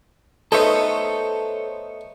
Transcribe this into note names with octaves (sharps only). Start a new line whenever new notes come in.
A3 B3 D#4 A4 C5 C#5